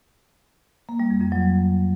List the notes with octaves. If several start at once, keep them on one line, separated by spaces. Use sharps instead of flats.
A#3
G3
F2
F2
F#3